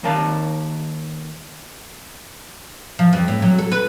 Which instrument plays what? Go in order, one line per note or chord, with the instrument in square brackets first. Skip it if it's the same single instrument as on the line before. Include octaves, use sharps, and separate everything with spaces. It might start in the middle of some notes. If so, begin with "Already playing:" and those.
[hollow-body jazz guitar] D#2 D#3 A#4 F5 A5
[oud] F3
F2
A2
F#3
A4
B4